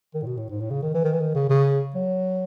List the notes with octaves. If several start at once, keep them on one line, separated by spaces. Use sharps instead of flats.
D#3
A2
B2
A2
G#2
A2
C#3
D#3
E3
D#3
E3
D#3
C#3
C#3
F#3